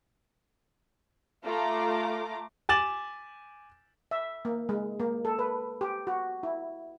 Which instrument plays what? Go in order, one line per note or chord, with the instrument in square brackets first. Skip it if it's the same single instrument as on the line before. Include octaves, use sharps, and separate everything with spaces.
[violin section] A3 F4 A#5 D6
[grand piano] G#5 D6 A6 E7 F#7
[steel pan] E5
A#3
G#3
A#3
A4
B4
G4
F#4
E4